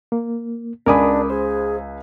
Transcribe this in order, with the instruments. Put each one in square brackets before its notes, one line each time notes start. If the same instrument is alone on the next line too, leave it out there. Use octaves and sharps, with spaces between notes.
[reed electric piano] A#3
[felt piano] C#2 G#5 B5 [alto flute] D4 [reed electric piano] A#4 D6 D#6
[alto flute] G#4 [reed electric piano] C5